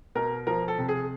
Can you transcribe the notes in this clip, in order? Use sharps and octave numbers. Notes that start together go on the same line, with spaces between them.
B2 A#4
F3 A#4
A4
C3
G#4